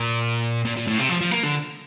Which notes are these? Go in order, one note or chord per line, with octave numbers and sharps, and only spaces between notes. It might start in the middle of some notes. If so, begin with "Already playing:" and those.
Already playing: A#2
A#2
A#2
A2
C3
F3
F3
A#3
D3